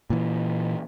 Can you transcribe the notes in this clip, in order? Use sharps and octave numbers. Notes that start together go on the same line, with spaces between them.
A#2 E3